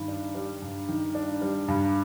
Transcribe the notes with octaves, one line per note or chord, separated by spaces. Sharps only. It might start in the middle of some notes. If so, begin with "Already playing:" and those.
Already playing: G2 D#3
D4
G3
G2
D#3
D4
G3
G2